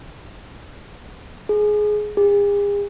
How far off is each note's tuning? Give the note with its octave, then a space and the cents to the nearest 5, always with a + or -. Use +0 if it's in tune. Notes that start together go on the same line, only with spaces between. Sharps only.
G#4 +15
G#4 -40